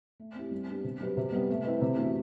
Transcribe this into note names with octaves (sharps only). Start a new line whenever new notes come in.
A3
C4 E4 G4
G3
B3 D4 G4
C3
F#3 C4 G4 B4
C3
G3 B3
A3
C4 E4 B4
C3
E3 A3 D4 F#4